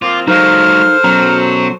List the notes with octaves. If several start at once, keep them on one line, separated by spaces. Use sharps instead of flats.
F3 A#3 C4 F4 D6
F#3 G#3 D#4 A4 A#4 C5 F5 F6
B2 F#3 C#4 A#5